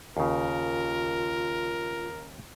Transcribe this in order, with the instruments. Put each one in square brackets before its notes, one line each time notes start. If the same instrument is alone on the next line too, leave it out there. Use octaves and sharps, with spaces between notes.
[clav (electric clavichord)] D#2 C#3 [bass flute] F4 [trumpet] A#4